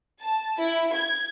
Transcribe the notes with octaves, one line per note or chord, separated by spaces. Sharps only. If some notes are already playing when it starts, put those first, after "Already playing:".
A5
E4
G#6